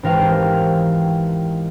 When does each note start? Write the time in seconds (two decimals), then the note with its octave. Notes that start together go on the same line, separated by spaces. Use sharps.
0.03 G#1 E3 G4 A#4 C5 F5